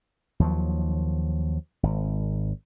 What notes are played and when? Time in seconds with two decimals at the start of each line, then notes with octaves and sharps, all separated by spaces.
0.40 D#2 F3 F#3
1.83 G#1